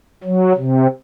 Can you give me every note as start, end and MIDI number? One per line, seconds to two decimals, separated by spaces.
0.24 0.53 54
0.56 0.87 48